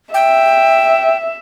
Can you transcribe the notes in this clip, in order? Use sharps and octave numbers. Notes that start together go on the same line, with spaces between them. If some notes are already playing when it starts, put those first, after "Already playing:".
E5 G5